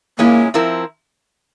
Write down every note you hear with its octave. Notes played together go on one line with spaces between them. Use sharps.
A#2 G#3 A#3 C#4 E4
F3 C4 E4 A#4